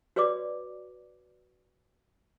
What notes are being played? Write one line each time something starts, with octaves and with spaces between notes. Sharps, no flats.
F#4 B4 C#5 D5 D6